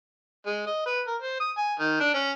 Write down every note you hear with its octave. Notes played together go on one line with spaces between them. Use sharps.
G#3
D#5
B4
A#4
C5
D#6
G#5
D#3
D4
C#4